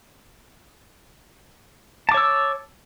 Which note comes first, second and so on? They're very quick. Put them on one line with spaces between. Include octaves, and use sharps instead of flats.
A5 D6 C#5 E6